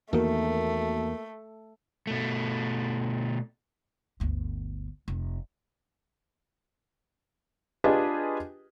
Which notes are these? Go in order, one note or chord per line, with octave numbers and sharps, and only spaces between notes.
E2 D#3 A3 A#3 F#4 A#4
B2 A3
G1 D2
F1
D4 F4 G4 G#4 B4 D#5